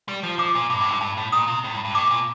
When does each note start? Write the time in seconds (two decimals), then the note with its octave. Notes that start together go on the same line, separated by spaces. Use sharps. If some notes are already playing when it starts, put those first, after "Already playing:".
0.08 G3
0.23 F3
0.39 F3 D6
0.55 A#2
0.70 G2 D6
0.81 A2
0.90 G2
1.01 G2 A5
1.17 A2
1.32 A#2 D#6
1.47 C3
1.64 A2
1.74 G2
1.85 G2
1.94 A2 D6
2.10 A#2